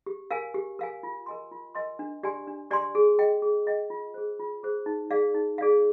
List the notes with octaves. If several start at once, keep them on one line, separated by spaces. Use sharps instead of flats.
G4
A#4 F5 G#5
G4
A#4 F5 G#5
F4
A#4 D#5 G#5 C6
F4
A#4 D#5 G#5 C6
D4
G4 D5 G#5 C6
D4
G4 D5 G#5 C6
G#4
D#5 G5
G#4
D#5 G5
F4
G#4 C5
F4
G#4 C5
D#4
G#4 D5 F5
D#4
G#4 D5 F5